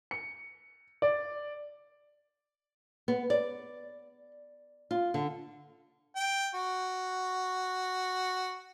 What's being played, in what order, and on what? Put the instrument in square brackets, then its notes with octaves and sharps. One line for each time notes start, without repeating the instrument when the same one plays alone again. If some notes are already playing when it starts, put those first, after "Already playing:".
[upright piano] C#7
D5
[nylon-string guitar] B3
D5
F4
D3
[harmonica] G5
F#4